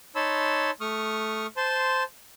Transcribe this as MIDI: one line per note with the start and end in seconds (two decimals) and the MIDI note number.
0.15 0.71 63
0.15 0.71 73
0.15 0.71 81
0.15 0.71 83
0.15 0.71 84
0.15 0.71 88
0.81 1.47 57
0.81 1.47 85
0.81 1.47 87
0.81 1.47 89
1.57 2.04 72
1.57 2.04 81
1.57 2.04 84